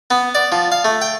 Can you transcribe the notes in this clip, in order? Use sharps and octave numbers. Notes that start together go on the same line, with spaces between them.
B3
D5
F3
F5
A3
G5